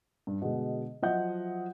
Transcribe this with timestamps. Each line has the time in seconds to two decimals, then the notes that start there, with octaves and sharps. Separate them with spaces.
0.27 G2
0.42 B2 D3 G#3
1.02 F3 F#3 D#5 E5 F#5 G6